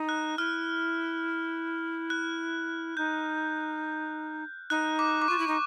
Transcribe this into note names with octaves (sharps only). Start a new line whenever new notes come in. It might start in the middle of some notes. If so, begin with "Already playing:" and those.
Already playing: D#4
F#6
E4 F6
F#6
D#4 G6
D#4 F#6
D6
D6
F4 C#6
E4
D#4